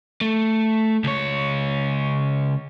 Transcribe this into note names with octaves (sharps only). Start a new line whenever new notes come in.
A3
C#2 C#5